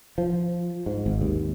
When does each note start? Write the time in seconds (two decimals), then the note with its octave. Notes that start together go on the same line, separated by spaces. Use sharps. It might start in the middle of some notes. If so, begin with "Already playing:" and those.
0.18 F3
0.86 G#2
1.06 G#1
1.22 D#2